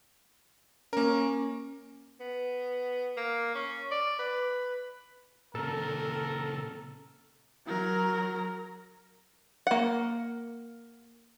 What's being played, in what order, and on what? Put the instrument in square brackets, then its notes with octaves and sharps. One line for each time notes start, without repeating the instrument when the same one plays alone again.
[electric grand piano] A#3 A#4 [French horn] C#4
[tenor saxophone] B3
A#3
C#4
D5
B4
[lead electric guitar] A#2 C#3 [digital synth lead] A4 [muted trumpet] A#4
[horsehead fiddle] F#3 A#4
[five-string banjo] A#3 F#5